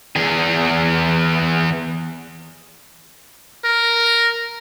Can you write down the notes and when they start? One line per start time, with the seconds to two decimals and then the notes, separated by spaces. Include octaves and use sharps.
0.16 E2 G#4
3.65 A#4